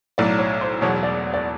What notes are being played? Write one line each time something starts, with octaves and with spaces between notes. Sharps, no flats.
B1 A2 F#3 D5
C#5
C5
E1 E2 B2 F#3 C#5
D5
D5